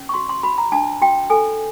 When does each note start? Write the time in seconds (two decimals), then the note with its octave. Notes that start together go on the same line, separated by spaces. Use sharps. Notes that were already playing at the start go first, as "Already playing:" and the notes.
Already playing: C#4
0.09 C#6
0.14 F#4 C6
0.29 C6
0.43 F#4 B5
0.58 A#5
0.72 D4 A5
1.01 F#4 G5
1.30 A4 G#5